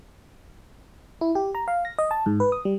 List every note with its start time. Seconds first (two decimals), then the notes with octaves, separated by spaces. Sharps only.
1.21 E4
1.35 G4
1.55 A#5
1.68 F5
1.85 A#6
1.99 D#5
2.11 A5
2.26 G#2
2.40 B4
2.52 D#6
2.65 G3